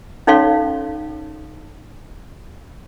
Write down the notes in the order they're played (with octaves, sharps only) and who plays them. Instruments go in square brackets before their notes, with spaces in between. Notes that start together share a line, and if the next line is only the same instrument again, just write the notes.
[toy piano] C#4 D#4 A4 C#5 F5 C6